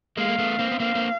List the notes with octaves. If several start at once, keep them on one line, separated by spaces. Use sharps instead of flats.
G#3 A#3 F5
A#3
A3 B3
A#3 C4
B3
A#3 C4 F5
A#3 C4